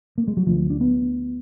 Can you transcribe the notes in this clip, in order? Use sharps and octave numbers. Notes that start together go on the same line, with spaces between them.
A#3
G#3
F#3
D2 D3 F3
D4
B3